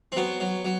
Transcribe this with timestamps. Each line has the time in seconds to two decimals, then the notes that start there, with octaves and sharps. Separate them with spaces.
0.12 C4
0.16 F#3 B3
0.40 F#3
0.65 F#3